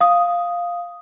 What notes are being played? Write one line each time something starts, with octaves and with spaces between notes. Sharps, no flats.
F5 D#6